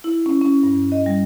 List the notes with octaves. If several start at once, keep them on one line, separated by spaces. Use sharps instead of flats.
E4
C#4
C#4
G2
D#5
G3